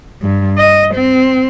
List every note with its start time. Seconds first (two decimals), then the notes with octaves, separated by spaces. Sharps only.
0.22 G2
0.58 D#5
0.94 C4